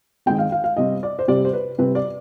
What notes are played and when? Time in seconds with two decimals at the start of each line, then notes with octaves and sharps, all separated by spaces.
0.26 D#3 G#3 C4 G5
0.39 F5
0.52 F5
0.64 F5
0.76 C3 G3 C4 D#5
1.03 D5
1.19 C5
1.28 C3 G3 C4 D5
1.45 C5
1.53 B4
1.78 C3 G3 C4 B4
1.95 D5